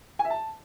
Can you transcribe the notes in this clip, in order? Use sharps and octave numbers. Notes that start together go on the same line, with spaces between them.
G#5
E5
A5